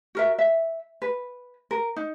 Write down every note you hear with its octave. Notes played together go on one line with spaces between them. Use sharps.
F#4 A#4 E5
E5
B4
A#4
D#4